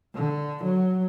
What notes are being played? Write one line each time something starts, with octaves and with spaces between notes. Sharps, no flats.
D3
F#3